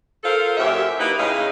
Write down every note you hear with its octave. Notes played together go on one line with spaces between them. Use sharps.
F4 A4 A#4 C5 F5
F#2 A#2 G4 C#5 E5
A#3 D#4 E4 B4
A2 C#3 D#4 G#4 F5